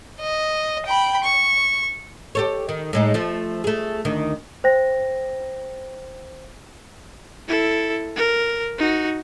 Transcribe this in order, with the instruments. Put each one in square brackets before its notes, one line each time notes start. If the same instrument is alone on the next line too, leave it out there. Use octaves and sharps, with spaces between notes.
[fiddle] D#5
G5 B5
C#6
[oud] G4 A4 C#5
D#3
A2 G#3 D#4
F3 A3
A3 G#4
D2 D#3
[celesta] C5 G5 A#6
[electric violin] E4 A4
A#4
D#4 F#4